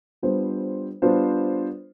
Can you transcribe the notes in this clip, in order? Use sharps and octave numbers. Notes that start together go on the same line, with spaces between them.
G3 B3 D4 F4 C5
G3 B3 D4 F4 C5